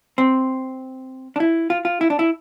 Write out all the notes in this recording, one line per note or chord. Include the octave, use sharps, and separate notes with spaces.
C4
D4
E4
F4
F4
E4
D4
E4